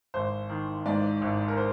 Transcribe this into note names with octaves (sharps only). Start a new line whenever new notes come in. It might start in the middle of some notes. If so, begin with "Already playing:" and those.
G#1 C5
D#3
G#2 D5
G#1
A#4
C5